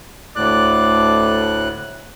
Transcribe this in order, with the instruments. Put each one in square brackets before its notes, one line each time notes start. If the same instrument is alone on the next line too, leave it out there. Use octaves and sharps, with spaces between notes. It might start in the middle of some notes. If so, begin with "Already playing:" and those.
[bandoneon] D2 A2 F#6 [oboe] D5